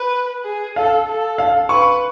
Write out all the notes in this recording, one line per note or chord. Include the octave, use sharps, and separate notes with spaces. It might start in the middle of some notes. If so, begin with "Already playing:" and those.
Already playing: B4
G#4
A4 F5
A4
F5
B4 C#6